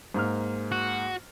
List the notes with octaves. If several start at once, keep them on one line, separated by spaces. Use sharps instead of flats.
G#2 A#3 F6
F#4